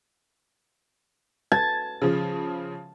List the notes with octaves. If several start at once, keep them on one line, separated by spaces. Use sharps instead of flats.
A5 G#6
C#3 F3